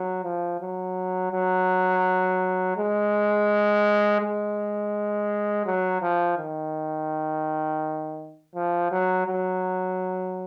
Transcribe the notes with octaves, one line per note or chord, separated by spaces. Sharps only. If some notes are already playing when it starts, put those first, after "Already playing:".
Already playing: F#3
F3
F#3
F#3
G#3
G#3
F#3
F3
D#3
F3
F#3
F#3